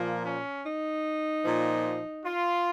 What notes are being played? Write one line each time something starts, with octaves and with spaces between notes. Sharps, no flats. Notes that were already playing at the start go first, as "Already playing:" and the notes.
Already playing: A#2 F3 A#3
C#4
D#4
A#2 F3
F4